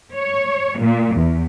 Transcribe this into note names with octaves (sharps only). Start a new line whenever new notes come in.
C#5
A#2
E2